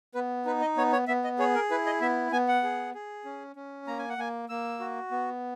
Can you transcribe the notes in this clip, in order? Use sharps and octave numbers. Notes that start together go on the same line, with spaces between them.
B3 B4
D#4 B4
D#5
B3 C#5
C#5
B3 E5
D#5
G#4 C#5
A#4
E4 B4
D#5
B3 E5
B3 G#5
F#5
G#4
G#4
C#4
C#4
A#3 A#5
G#5
F#5
A#3 G#5
A#3 E6
F#4
B3